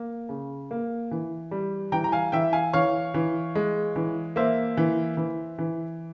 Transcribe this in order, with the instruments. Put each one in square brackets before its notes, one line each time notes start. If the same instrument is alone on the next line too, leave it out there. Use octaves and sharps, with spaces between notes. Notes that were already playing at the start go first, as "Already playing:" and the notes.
Already playing: [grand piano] A#3
C#3
A#3
E3
G3
E3 G5 A#5
A#5
F5 G#5
E3 E5 G5
F5 G#5
E3 C#5 F5
E3
G#3
E3
A#3 C5 E5
E3
E3
E3